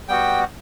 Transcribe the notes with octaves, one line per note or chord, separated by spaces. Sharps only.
G3 B3 F#4 G5